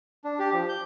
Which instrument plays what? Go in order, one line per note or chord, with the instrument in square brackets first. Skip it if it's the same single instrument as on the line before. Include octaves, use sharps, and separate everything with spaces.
[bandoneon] D4
G4
F3
G6